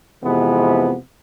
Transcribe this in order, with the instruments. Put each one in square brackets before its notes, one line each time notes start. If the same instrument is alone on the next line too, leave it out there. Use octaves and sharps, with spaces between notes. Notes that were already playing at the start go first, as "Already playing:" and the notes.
[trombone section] F2 C3 E3 G#3 B3